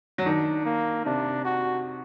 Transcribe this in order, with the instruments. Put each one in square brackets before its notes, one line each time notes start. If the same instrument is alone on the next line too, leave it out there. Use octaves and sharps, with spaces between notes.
[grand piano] F#3
[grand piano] D#3 [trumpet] D4
[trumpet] A#3
[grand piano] C3 [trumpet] D4
[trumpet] F#4